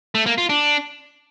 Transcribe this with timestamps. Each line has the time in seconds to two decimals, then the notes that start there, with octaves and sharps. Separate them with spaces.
0.15 A3
0.26 A#3
0.38 F4
0.49 D4